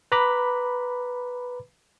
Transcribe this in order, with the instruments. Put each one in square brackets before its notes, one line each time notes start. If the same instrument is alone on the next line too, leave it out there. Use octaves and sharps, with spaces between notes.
[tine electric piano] B4 A#5 B5 D6